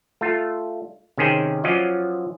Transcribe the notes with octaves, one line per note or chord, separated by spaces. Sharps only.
A3 F4
C3 D#3 C#4 G#4 C5 G5
F3 F#3 C#4 F4 D5 D#5